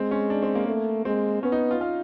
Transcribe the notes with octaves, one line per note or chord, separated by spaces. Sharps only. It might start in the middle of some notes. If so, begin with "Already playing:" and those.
Already playing: G#3 C4
C#4
D4
C4
A#3
A3
G#3 C4
B3 C#4
D#4
F4
F4